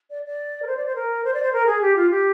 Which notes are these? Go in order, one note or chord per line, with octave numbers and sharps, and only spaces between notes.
D5
D5
A#4
C5
D5
C5
A#4
C5
D5
C5
A#4
G#4
G4
F4
G4